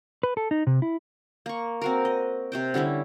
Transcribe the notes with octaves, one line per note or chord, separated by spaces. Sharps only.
B4
A4
D#4
C3
E4
A#3 C#6
C4 F#4 A#4
D#5
C3 C5 G5
D3 G3 C#4 E4